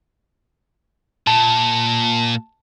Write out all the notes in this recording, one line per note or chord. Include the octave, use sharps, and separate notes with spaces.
A#2 A5